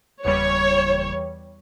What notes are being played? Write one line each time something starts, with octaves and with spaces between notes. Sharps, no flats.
F#1 E2 E3 G3 C#5